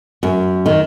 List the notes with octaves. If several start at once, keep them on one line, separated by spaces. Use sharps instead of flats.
F#2
D#3